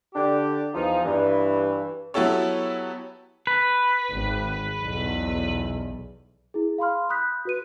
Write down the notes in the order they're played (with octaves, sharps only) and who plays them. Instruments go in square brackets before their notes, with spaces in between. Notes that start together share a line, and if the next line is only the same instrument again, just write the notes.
[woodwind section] D3 D4 G4
E2 F3 D#4
G2 E3
[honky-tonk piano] F#3 B3 E4 G4 A4 C#5
[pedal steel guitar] B4
[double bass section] G#1
B1 E2
[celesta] E4 G#4
F5 B5 C6 F6
B5 D#6 F#6 G6 B6
F#4 B4 D#7